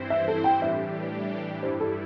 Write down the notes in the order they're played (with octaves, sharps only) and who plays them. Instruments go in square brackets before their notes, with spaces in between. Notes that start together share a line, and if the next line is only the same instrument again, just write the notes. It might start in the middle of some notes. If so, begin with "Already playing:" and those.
Already playing: [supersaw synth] G2 E3 C4 E4 C5
[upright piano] E5
A4
G5
[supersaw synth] A2 E3 G3 D4 G4 [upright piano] E5
[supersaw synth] G2 G3 E4 [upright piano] C5
[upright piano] A4